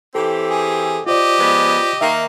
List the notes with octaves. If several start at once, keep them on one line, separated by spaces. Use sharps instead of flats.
E3 C4 G4 A4
G#4
F4 G4 C5 D5 D#5
F3 G#3 B3
D#3 A#3 E5